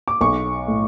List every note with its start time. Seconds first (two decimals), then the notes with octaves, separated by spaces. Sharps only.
0.08 D6
0.21 B1 C#6
0.68 A2